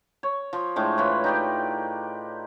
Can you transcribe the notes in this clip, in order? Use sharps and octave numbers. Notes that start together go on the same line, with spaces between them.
C#5
F3
A2 G#3 A3 D4
E3 F4 B4 C#5
D#4 G4 D5